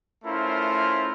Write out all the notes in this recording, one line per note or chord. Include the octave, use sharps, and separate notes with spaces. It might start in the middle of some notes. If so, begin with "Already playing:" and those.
A3 C#4 E4 F4 A#4 C5